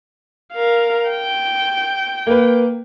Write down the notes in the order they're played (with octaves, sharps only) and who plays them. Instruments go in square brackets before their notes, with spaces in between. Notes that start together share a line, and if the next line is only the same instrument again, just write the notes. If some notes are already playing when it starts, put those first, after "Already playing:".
[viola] A#4 F5
G5
[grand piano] A#3 B4